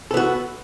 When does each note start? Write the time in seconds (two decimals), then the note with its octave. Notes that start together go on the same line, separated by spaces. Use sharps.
0.11 A4
0.14 B3
0.17 F#4